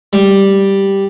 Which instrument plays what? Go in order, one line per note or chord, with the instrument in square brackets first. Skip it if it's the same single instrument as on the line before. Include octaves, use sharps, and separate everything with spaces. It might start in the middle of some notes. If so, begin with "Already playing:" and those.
[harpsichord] G3